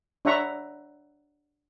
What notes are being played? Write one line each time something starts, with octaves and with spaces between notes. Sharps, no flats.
D4 C#5 E5 F#5 A#5 C#6